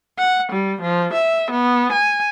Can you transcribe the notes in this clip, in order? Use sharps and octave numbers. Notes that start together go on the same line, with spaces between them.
F#5
G3
F3
E5
B3
G#5